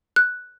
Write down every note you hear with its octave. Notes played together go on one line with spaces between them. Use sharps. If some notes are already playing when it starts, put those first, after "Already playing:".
F#6